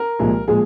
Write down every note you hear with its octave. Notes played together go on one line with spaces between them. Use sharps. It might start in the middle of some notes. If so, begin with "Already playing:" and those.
Already playing: A#4
C2 A#2 F3 G#3
A#2 F3 G#3 G#4